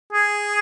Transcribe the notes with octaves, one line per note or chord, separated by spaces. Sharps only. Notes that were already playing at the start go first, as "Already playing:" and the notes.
G#4